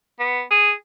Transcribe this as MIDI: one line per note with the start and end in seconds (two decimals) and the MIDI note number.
0.20 0.42 59
0.51 0.73 68